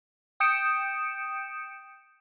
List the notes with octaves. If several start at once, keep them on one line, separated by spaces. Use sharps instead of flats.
G5 D#6 G6 C#7 D7 E7